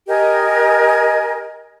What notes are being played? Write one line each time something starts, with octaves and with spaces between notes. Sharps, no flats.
G4 A#4 D#5 G#5